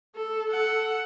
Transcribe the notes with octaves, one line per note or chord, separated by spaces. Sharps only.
A4
A4 F#5